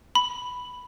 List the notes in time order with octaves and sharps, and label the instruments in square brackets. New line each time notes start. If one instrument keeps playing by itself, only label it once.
[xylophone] B5